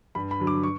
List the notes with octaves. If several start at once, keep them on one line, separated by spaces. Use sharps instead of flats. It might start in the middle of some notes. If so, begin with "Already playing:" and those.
G2 B5
B5
D3 F#3
D6
C#6